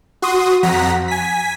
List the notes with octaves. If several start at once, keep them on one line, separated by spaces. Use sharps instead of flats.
F#4 C6 D#6
F2 F#5 A#5 B6
G#5 B6